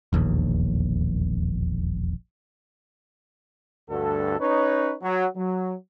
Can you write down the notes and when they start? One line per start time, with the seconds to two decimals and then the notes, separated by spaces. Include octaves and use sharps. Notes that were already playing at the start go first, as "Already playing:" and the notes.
0.13 E1 A#1 D#2
3.90 D2 G2 F#4 A4
4.39 C#4 D#4 B4 C#5
5.02 F#3
5.36 F#3